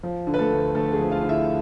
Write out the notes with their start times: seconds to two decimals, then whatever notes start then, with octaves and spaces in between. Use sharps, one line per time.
0.03 F3
0.27 D3
0.34 B4
0.39 A3 A4
0.52 D2
0.75 D2 A3 A4
0.93 G#4
1.00 F3
1.11 F4 F5
1.23 D3
1.29 E4 E5